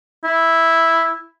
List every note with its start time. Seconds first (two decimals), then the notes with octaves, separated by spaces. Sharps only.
0.24 E4